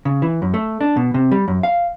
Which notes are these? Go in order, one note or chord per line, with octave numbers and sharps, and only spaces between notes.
C#3
E3
F#2
A3
D4
B2
C3
G3
F#2
F5